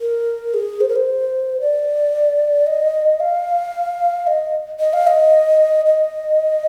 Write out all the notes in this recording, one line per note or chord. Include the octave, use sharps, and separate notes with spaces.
A#4
G#4
C5
A#4
C5
D5
D#5
F5
D#5
D#5
F5
D#5
D#5